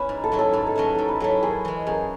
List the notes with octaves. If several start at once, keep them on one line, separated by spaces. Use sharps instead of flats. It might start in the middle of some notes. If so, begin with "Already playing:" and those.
Already playing: C#4 E4 B4
G#2
A4
F#3 C#4 E4
A4
G#2 B4
A4
F#3 C#4 E4 B4
G#2 A4
B4
F#3 C#4 E4 A4
F#2 G#4
E3 G#3
F#2 G#4